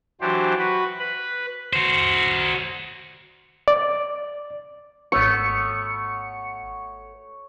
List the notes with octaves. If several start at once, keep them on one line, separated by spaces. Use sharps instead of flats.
E3 F#3 D4 G4 C5
F#4 B4 B5
B4 B5
F#4 C5
D5
G#1 A3 B3 C#5 C#7